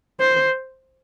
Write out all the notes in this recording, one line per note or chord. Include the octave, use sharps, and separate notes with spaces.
C5